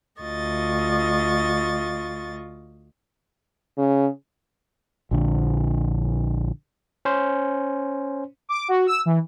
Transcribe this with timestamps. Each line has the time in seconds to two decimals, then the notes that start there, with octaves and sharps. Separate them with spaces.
0.22 D2 F4 D#5 C#6 A6
3.78 C#3
5.11 A#1 D3
7.05 C#4 C5
8.49 D6
8.68 F#4
8.87 E6
9.06 E3